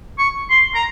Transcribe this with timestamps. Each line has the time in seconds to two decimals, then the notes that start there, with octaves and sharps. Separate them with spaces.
0.18 C#6
0.50 C6
0.75 A#5